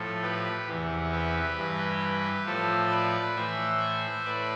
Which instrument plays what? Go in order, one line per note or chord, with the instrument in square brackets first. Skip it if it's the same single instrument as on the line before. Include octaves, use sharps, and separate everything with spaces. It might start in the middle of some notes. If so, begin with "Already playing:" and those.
Already playing: [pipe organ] A2 F3 A4
G4 B4
E2 C3 E3
G4 B4
G2 E3
A2 F3 A4 C5
B4 D5
A2 E3 C5 E5
A2 B4 D5